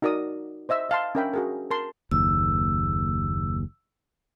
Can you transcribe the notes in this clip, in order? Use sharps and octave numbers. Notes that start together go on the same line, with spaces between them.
D#4 F#4 A#4 D5 D#6
C5 D#5 E5 E6
D#5 F5 A5 C6
C#4 D4 A#4 E5 G5 B5
F#4 G#4 A#4
A#4 A5 C6
F#1 D#2 E6